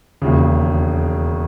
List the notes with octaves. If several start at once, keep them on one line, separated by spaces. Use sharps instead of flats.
E1 D#2 C#3